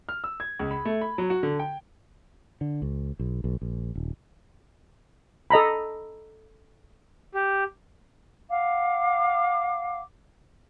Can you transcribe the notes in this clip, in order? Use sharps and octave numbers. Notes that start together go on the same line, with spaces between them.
F6
E6
G#6
C#2
B5
A3
B5
F#3
F#4
D3
G5
D3
C#2
B1
B1
A#1
D#1
A4 D#5 A#5 B5
G4
F5 F#5 D6